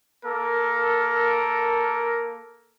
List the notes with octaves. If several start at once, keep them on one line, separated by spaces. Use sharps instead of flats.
A#3 A4 A#4